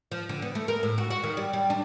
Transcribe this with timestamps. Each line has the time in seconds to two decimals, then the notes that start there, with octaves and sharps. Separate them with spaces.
0.12 F3
0.29 D3
0.42 B3
0.55 A3
0.68 A#4
0.83 A2
0.98 F#4
1.10 F#4
1.24 D#3
1.37 G3
1.53 G3
1.70 D4